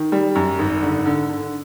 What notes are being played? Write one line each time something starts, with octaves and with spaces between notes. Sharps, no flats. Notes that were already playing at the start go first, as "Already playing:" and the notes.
Already playing: D#3
G3
F#2
G#1
D3
D3
D3